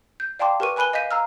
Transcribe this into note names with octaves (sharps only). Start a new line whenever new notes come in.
G6
D5 F5 G5 A5 C6 D6
G4 A#4 B4 C#6 D#7
B4 G#5 B5 F#6 D#7 G7
D#5 F5 G6 B6 D#7
F5 A#5 E6 F6